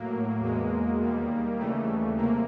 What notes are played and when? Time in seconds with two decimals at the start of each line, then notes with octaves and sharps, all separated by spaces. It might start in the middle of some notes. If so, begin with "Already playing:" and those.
Already playing: A2 F#3 A#3
0.39 E2 B2 G#3
0.98 D#2 D#3 G3
1.58 D#2 C#3 E3 G3 A3
2.17 C3 A#3